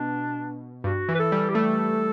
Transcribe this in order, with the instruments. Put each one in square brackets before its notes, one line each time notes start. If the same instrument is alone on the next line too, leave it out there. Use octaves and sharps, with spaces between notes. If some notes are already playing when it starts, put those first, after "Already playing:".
Already playing: [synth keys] B2 [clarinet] D4
[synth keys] G2 [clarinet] F#4
[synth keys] E3
[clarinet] B4
A4
[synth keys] G3
[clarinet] G4
[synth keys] A3 [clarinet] A4